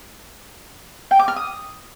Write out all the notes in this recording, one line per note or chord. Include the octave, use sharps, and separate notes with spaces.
G5
D6
F6
D#6